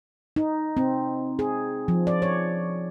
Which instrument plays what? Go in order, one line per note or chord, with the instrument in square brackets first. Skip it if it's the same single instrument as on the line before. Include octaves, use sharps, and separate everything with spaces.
[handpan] D#4
C4
G#4
F3
D5
C#5